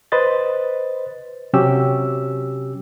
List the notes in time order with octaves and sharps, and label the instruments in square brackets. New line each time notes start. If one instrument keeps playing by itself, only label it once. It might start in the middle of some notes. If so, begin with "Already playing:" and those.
[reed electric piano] B4 C5 D#5 A6
C3 F#3 C#4 G4 E6